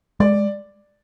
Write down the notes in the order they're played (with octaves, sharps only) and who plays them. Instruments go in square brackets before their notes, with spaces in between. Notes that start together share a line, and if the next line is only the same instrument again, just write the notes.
[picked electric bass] G#3 [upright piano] D5